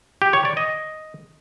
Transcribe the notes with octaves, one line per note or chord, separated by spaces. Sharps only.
G4
C#5
D5
D#5